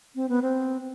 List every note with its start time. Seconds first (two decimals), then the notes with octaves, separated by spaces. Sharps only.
0.15 C4
0.29 B3
0.42 C4